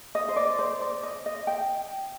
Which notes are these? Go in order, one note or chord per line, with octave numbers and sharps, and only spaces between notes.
D#5
C5
D5
C5
D5
D#5
D#5
G5